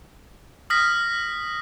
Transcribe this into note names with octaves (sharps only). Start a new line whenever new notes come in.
D#6 F6 A#6 B6